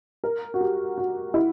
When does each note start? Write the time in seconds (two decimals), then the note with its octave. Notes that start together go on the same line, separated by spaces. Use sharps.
0.24 A#4
0.54 F#4
0.61 G4
0.98 F#4
1.34 E4